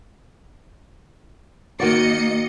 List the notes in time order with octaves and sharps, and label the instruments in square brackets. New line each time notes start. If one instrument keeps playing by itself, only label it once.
[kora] D#3 F#4 D5 [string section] A#3 D#5 C#7